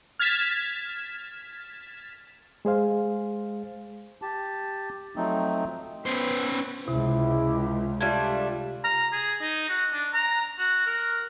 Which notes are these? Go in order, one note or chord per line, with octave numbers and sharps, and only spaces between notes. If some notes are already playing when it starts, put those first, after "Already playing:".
F6 G#6 A6 B6 E7
G#3 G#4 C5 F5
G4 A5
F3 F#3 A3 C4 D#4
B3 C#4 C5
C#2 C3 E4
G3 A3 D4 F4 G#6
A#5
G#4
D#4
F#4
D4
A#5
F#4
A#4